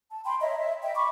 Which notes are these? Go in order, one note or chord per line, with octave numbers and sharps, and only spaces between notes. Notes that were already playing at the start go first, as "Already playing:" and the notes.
A5
G5 B5 C6
C#5 D#5 E5 A#5
E5
D#5 E5 G5
B5 C#6 D6